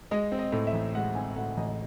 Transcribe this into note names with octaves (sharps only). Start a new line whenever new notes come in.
G#3 D#5
C4
D#5
A2
E5
A1
G#3 F#5
C4 G#5
A2 F#5
A1 D#5